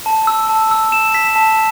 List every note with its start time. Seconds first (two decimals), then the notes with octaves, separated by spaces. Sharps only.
0.06 A5
0.27 E6
0.50 A5
0.71 E6
0.92 E7
1.14 B6
1.36 A5